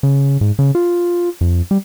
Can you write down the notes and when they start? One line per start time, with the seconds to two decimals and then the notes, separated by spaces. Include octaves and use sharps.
0.03 C#3
0.41 G#2
0.59 C#3
0.75 F4
1.41 F2
1.71 G3